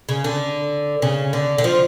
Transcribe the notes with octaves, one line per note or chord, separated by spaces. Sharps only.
C#3
D3
C#3
D3
D3
F3